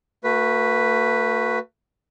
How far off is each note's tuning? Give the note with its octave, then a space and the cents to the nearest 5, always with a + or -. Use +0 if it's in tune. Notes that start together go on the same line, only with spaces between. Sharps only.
A3 +45 F#4 +0 B4 +0